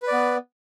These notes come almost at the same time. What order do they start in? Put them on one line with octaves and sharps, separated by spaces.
B4 D5 B3